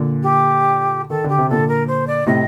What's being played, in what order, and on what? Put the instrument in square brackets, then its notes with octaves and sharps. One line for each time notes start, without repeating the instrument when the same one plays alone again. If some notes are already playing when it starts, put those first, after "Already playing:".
Already playing: [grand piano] A#2 D3
[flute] G4
[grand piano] D#3 [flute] A4
[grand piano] D3 [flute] G4
[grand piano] C3
[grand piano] A#2 D3 [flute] A4
[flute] A#4
C5
D5
[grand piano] A2 C3 [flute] D#5